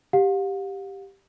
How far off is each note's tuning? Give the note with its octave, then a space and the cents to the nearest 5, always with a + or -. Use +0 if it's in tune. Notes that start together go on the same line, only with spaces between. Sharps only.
G4 +0 F5 +45